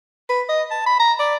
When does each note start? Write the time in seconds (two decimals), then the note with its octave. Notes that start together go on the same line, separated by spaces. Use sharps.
0.29 B4
0.49 D#5
0.71 A5
0.86 B5
0.99 A#5
1.20 D5